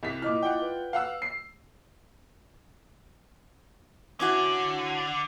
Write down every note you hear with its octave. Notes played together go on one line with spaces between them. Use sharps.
C2 B6
A#2 E4 D#5 D6 F6
F4 D5 F#5 G5
B4
F5 F#5 E6
C7
D3 C#4 E4 F#4